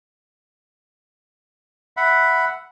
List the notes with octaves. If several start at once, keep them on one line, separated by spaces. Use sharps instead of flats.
E5 F#5 B5